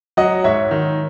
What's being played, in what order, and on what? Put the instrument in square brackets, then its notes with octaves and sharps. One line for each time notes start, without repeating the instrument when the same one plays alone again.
[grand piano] F#3 D#5 F#5
G#2 C#5 E5
D#3